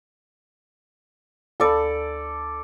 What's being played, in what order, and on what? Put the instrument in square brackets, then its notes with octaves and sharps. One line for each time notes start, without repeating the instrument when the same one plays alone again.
[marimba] D2 A5 B5 [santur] A4 D5